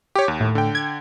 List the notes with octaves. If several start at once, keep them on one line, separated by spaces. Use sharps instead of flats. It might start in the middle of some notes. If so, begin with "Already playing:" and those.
G4 C#5
D#2
A2
D3 G5
G#6